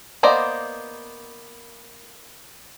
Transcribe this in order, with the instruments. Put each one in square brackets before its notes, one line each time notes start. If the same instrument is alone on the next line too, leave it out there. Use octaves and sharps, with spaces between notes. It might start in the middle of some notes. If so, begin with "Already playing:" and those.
[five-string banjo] A#3 B3 C5 D5 D#5